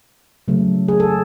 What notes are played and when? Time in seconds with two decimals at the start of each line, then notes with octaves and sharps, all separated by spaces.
0.48 C#3 F#3 A3
0.88 G#4
1.00 A4